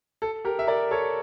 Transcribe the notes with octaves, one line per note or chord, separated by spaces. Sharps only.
A4
G4 A#4
E5
A#4 D5
A4 C#5